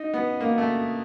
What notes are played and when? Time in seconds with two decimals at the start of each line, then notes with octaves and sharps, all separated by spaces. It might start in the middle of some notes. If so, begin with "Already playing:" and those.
Already playing: D#4
0.14 B3
0.41 A#3
0.58 A3